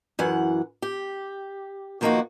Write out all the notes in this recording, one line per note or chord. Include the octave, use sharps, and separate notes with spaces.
F#2 E3 F#5
G4
D#3 F3 A#3 C#4 D#4 F#4